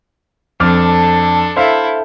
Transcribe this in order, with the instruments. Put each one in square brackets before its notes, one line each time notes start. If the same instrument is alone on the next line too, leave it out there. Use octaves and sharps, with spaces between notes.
[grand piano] F2 D6 F6 [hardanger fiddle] D4 A4
[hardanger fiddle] E4 A4 [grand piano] C5 E5 F5